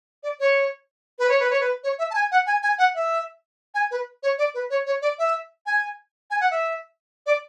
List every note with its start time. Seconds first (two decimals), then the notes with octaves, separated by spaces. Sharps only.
0.23 D5
0.40 C#5
1.19 B4
1.29 C#5
1.40 B4
1.50 C#5
1.60 B4
1.84 C#5
1.98 E5
2.10 A5
2.15 G#5
2.32 F#5
2.47 G#5
2.63 G#5
2.78 F#5
2.95 E5
3.74 G#5
3.91 B4
4.23 C#5
4.38 D5
4.54 B4
4.70 C#5
4.86 C#5
5.02 D5
5.19 E5
5.66 G#5
6.30 G#5
6.41 F#5
6.51 E5
7.26 D5